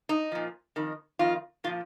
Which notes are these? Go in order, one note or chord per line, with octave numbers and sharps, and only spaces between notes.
D#4
A#2 F3
F2 D#3
F2 D#3 F4
A#2 F3 F4